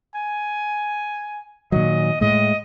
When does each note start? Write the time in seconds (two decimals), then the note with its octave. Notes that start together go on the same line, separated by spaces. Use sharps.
0.15 G#5
1.72 A#2 D#3 F#3 D#5
2.21 A2 G#3 D#5